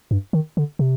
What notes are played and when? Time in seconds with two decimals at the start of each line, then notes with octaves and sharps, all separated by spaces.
0.11 G2
0.33 D#3
0.57 D3
0.79 C3